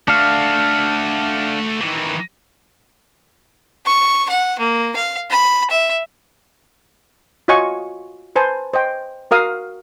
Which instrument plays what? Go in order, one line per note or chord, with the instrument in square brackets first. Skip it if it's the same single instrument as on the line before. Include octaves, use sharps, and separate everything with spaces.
[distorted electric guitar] A3 F#4 [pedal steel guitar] D4 F5
[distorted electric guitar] D#3 E3
[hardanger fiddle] C#6
F#5
A#3
F5
B5
E5
[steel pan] F4 F#4 C#5 D#5 G#5 C#6
B4 C5 G#5 A5
C5 D#5 G5
F#4 A#4 F5 D#6